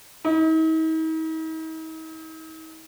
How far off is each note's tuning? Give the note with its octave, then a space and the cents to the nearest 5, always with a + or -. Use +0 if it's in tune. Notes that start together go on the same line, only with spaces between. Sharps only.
D#4 +45